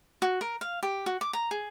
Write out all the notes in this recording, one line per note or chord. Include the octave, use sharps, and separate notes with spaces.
F#4
A#4
F5
G4
F#4
D6
A#5
G#4